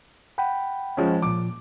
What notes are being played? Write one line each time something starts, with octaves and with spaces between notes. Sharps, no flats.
F#5 G5 B5
F3 G#3 C#4
A#2 F3 D6